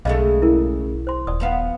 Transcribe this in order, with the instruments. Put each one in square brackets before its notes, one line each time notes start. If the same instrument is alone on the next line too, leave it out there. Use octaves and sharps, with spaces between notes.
[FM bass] B1 [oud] C#3 G#3 A3 [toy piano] D#5 F5
[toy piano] E4 A#4
C5 C6
[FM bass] D#1 [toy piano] D5 D#6
[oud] F3 B3 F5